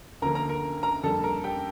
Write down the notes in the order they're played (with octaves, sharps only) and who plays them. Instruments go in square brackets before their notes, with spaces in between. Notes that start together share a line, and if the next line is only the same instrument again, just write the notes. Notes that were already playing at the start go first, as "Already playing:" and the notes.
[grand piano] D2 D3 F3 A#3 A#4 A#5
A#4 A#5
A#4 A#5
A#4 A#5
F2 D3 G3 A#3 A4 A5
A#4 A#5
G4 G5